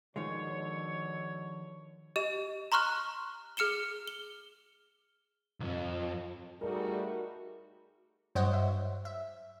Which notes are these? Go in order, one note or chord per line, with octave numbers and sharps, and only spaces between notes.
B2 D3 D#3 F3 G#3 C#5
G4 D#5 E7
A#5 C6 C#6 F6 F#6
G#4 F6 C#7 E7 G7
G7
B1 F2
G3 A3 D#4 F#4 G#4 A#4
G2 F#3 C5 C#5 D#5 F#5
E5
E5